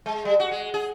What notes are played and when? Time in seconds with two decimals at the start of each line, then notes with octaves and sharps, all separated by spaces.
0.06 G#3
0.25 G3
0.40 F#4
0.51 G#3
0.74 G#4